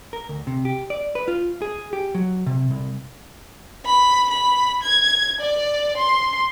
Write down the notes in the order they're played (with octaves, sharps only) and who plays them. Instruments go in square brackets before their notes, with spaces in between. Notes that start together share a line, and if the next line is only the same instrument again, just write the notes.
[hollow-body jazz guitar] A#4
D2
C3
G4
D5
B4
F4
G#4
G4
F#3
C3
C2
[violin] B5
B5
G#6
D5
C6